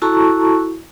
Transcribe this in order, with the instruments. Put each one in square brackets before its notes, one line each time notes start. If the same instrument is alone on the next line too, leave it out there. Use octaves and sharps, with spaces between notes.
[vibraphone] E4 F#4 A4 A5 A#5 C#6